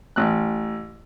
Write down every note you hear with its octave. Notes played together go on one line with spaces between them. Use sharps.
A1 F#6